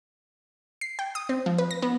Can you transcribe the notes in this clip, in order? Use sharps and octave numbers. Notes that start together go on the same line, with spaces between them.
C7
G5
D#6
C4
F3
B4
A#6
B3